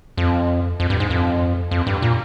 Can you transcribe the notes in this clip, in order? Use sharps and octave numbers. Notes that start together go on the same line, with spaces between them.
F2
F2
G2
G#2
F2
F2
G2
A#2